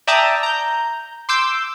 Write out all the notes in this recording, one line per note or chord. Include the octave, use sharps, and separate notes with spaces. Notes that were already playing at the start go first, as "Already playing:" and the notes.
D5 E5 G5 A5 A#5 D#6
A#5 G6
C6 D6 E6 G6